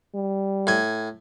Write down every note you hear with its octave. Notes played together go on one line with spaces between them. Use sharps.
G3
A2 G#5